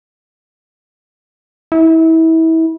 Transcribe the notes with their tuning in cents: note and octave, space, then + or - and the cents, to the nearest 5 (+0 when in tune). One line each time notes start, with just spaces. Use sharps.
E4 -30